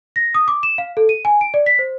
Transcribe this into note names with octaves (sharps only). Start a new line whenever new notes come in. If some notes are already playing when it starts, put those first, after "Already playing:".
A#6
D#6
D6
E7
F5
A4
D#7
G#5
D7
D5
B6
C5